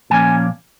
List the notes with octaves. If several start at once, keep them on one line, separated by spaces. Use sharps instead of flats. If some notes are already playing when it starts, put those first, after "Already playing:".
A#2 F3 A#3 C#4 G#5